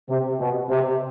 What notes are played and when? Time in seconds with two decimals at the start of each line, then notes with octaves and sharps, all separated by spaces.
0.09 C3
0.39 B2
0.69 C3